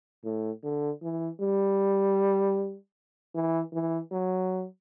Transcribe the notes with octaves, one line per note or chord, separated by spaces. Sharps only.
A2
D3
E3
G3
E3
E3
F#3